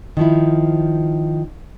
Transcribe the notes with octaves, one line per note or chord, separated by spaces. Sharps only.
D#3 F3 E4